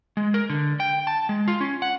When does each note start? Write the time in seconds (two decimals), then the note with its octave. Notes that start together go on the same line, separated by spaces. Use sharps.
0.17 G#3
0.34 A#4
0.50 D3
0.80 G5
1.07 A5
1.29 G#3
1.48 F4
1.60 C#4
1.82 F#5